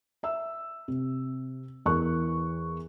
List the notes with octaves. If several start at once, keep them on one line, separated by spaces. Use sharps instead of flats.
E5 E6
C3
E2 E3 A#4 C#6 F#6